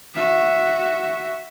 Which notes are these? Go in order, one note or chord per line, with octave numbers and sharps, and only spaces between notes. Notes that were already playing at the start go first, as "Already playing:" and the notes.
F#4 E5